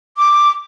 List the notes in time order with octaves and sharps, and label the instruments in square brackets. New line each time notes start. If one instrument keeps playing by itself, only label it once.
[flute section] D6